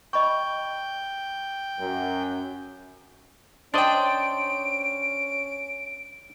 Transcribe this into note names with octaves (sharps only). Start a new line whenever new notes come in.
D#5 G5 B5 C#6
F#2
C#4 D4 C5 D5 D#5 G5 D7